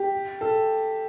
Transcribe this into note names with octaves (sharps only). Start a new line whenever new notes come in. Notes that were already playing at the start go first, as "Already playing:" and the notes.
Already playing: G4
A4